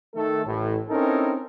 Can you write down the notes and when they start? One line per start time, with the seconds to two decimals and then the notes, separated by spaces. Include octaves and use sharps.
0.15 D#3 A3 A4
0.46 A1 A2
0.89 C4 C#4 D#4 E4 A4 A#4